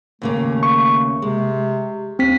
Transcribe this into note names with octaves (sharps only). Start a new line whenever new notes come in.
D#2 C#3 A3 A#3
C#6
C3 G#3
D#2 C4 B6